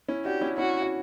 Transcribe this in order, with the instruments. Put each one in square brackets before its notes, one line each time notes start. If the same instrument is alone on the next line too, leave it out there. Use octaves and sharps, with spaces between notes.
[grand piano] C#4 E4
[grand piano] D4 F#4 [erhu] G4
[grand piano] C#4 E4
[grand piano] C#4 E4 [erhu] F#4
[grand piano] F#4